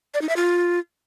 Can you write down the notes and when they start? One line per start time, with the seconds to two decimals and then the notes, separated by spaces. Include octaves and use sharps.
0.14 D5
0.22 D#4
0.29 E5
0.36 F4